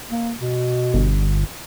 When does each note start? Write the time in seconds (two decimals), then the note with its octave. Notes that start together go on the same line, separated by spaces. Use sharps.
0.11 A#3
0.40 B2
0.94 G1